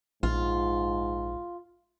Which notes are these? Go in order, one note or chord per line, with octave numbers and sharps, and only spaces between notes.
A#1 G#2 F4